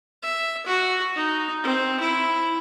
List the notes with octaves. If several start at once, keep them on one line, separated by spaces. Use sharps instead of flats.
E5
F#4
D#4
C4
E4